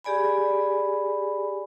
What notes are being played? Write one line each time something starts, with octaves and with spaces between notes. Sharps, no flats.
G4 G#4 D5 G#5 B5